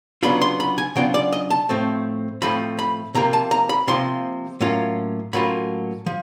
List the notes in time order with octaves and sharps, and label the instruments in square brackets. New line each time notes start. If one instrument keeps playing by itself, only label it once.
[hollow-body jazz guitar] C#3 F#3 B3 D4 F4 B5
C6
B5
G#5
C#3 F#3 B3 D4 F4 G5
D5
D#5
A5
A2 F3 A3 C4
A2 F3 A3 C4 B5
B5
C3 F3 A#3 A#5
A5
A#5
B5
C3 F3 A#3 C6
A2 F#3 A#3 C#4 F4
A2 F#3 A#3 C#4 F4 B5
F3